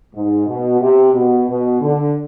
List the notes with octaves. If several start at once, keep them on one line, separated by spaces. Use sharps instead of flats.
G#2
B2
C3
B2
B2
D3